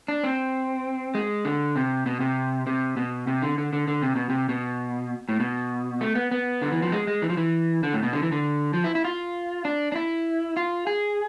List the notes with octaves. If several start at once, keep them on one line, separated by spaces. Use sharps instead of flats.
D4
C4
G#3
D3
C3
B2
C3
C3
B2
C3
D3
D3
D3
D3
C3
B2
C3
B2
A2
B2
A3
B3
B3
D3
E3
F3
G#3
G#3
E3
F3
E3
D3
A2
B2
D3
E3
D3
F3
E4
E4
F4
D4
D4
E4
F4
G#4